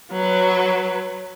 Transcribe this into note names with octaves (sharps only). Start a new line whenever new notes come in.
F#3 B4